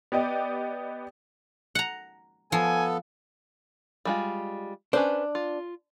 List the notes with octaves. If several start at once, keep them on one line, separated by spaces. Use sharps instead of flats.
B3 G4 D5 D#5
F#5 A#5
F3 B3 A4 G#5
G3 G#3 F4
C#4 D4 B4 C5
F4